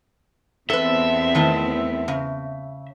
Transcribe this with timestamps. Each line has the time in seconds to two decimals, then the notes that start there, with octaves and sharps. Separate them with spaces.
0.70 E2 B3 C4 A4 B4 E5
1.35 D#3 A3 E4
2.08 C#3